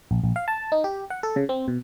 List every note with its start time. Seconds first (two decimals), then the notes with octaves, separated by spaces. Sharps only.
0.11 A#1
0.24 A#1
0.36 F5
0.48 A5
0.72 D#4
0.84 G4
1.10 F#5
1.23 A4
1.36 C#3
1.49 C4
1.68 B2